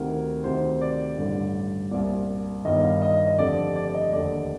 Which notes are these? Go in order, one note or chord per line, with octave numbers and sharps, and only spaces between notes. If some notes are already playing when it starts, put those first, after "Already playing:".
Already playing: D2 C3 D#3 A#4
D2 C3 D#3 C5
D5
A1 G2 D3
C2 A#2 D5
G1 G2 D#3 D#5
F5
D#5
D#5
F1 F2 D3 D5
D5
D5
D#5
F1 D#2 D3 D5